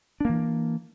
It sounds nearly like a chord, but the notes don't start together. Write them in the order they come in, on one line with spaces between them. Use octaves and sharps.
D4 A#3 E3